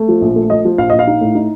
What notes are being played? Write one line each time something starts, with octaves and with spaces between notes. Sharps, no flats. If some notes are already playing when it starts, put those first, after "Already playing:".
Already playing: A3
F3
A#1
A3
F3 D#5
F3
A#1 F5
A#1 D#5
F5
D#4
A2
D#4